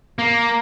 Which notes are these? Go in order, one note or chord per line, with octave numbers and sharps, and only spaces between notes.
A#3